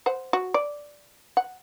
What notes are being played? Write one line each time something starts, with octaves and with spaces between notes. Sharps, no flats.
C5 F#5
F#4
D5
F#5